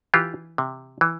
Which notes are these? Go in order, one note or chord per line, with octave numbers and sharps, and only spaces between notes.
E3 F4 G4
C3
E3